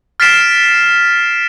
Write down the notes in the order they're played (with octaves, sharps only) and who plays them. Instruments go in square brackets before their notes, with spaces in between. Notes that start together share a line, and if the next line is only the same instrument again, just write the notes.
[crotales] F6 A6 B6 C7 D7 E7